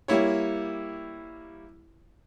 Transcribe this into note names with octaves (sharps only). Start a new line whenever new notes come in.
G3 A#3 E4 C#5